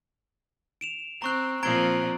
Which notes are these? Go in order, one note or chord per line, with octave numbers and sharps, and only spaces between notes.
D7 E7 F7
C4 A#5 C#6 F#6
A#2 F3 C4 A#5 G#6 D7